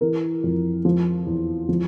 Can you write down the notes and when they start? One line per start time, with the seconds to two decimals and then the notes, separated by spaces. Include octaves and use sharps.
0.01 E3 A#4
0.44 F2
0.85 F3
1.27 E2
1.69 F3